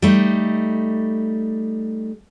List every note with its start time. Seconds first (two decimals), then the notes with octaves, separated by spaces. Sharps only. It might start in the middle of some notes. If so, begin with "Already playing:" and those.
0.02 G3 A3 D#4